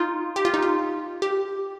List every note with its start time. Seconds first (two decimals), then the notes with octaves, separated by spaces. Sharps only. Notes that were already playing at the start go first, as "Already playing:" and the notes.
Already playing: D#4 F4
0.36 G4
0.45 F4
0.54 D#4
0.62 F4
1.22 G4